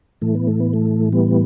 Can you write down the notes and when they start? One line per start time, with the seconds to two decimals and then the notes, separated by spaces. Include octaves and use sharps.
0.22 A2 E3 A3
0.35 B3
0.47 A3
0.60 B3
0.73 A3
1.13 G3 B3